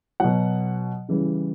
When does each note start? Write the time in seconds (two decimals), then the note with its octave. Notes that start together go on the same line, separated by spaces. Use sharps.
0.20 B2 F#3 F#5
1.09 C#3 E3 G3